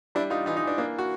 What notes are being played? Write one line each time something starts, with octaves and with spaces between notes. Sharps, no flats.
G3 D4 E4
G3 D#4 F4
E3 D#4 F4
D#4
E3
D4
A#3 D4
F#4